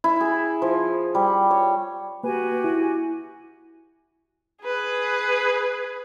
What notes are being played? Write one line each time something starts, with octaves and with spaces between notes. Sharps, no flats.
E4
G#4
F3
G3
C#5
A#3 F#4 G4 B4 G#5
E4
G#4 B4